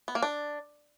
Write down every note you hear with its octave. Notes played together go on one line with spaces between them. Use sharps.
B3
A#3
D4